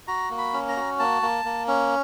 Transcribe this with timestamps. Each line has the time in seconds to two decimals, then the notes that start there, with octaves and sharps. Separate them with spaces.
0.08 F#4 A#5
0.31 A#3
0.38 B5
0.53 C#4
0.69 A#5
0.76 F#4
0.99 A#3 A5
1.22 A#3
1.45 A#3
1.68 C#4